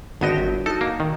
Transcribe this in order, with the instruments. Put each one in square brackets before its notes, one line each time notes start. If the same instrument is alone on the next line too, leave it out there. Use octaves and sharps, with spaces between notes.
[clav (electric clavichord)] G#1 B3 D#5 [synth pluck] D3 F#4 G4
[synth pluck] G1 F#2
[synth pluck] D#4 F#4 [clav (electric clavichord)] A4
[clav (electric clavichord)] A#3
D#3